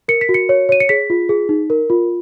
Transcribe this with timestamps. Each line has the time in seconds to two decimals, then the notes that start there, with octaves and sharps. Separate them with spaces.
0.08 A#4 C#7
0.21 B6
0.29 F#4
0.34 C#7
0.49 C#5
0.69 C#5 D#7
0.80 C#7
0.89 G#4 B6
1.10 F4
1.29 G#4
1.49 D#4
1.70 A#4
1.90 F4